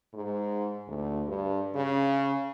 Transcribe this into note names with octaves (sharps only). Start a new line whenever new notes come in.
G#2
D2
G2
C#3